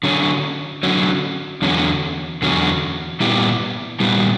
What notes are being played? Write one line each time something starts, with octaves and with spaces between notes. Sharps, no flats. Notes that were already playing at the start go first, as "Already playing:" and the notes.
D3 F#3 C#4
D3 F#3 C#4
E2 D3 F#3 C#4
E2 D3 F#3 C#4
A#2 G3 B3 E4 G4
A#2 G3 B3 E4 G4